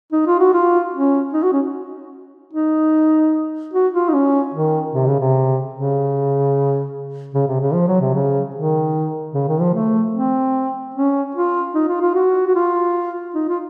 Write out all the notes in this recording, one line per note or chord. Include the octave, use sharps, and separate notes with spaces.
D#4
F4
F#4
F4
C#4
D#4
F#4
C#4
D#4
F#4
F4
D#4
C#4
D#3
C3
C#3
C3
C#3
C#3
C3
C#3
F3
F#3
C3
C#3
D#3
C#3
D#3
F3
A3
C4
C#4
F4
D#4
F4
F4
F#4
F#4
F4
D#4
F4